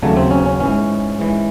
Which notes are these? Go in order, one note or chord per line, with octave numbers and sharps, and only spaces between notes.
D#2 C#3 F#3 A3
C4
C#4
C#4
G#2 E3 C#4
G#2 E3